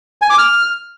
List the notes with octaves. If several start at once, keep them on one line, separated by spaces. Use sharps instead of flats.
G#5
D6
F6